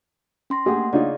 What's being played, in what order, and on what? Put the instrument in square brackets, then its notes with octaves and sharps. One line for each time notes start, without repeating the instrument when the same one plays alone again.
[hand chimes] C#4 C6 A#6
[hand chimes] A3 A#3 F#5 [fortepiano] G4 G#4
[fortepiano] C#3 D#4 F4 [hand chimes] G#4 D5